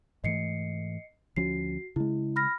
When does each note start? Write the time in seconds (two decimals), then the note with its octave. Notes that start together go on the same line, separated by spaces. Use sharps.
0.24 G#2 E3 A3 D#5 C7 C#7
1.36 D2 F3 C#4 F#4 C7
1.96 C#3 G#3 E4
2.36 B5 F6 A#6